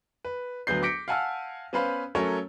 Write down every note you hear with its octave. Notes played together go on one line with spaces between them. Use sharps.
B4
D2 F#3 B3 G6 C7
D6 G6 A#6 B6 C#7 D7
F5 F#5 G#5 A5 E6 F6
B3 C#4 B4 C5 F5 B5
F#3 A3 C#4 A4 A#4 C#5